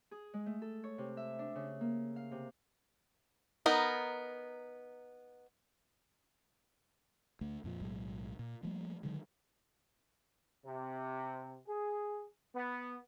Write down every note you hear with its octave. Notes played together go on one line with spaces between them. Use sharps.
G#4
G#3
A3
A4
C#5
C3
E5
D4
C#3
A#3
F5
C3
B3 D#4 A#4
D2 A3
F2 A#2 F3
B1 A2 F#3 G#3
A#2
F3 G3 A3 A#3
D3 D#3 F#3 G#3
C3
G#4
B3